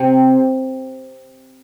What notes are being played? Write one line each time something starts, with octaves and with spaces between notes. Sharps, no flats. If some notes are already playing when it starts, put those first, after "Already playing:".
Already playing: C3